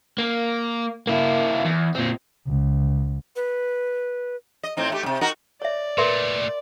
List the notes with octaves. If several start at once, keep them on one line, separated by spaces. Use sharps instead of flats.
A#3
A#3 E4
E2
A#2 C4
C#2
B4
D#5
A2 C4 D#4
A3 E4 G4
G#2 C3
D#4 F#4 A#4
C#5 D5 E5
A#2 A3 A#4 B4 E5 C6